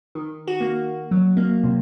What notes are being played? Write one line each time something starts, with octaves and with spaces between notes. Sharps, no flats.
D#3
F#4
A#3
F#3
A#3
C3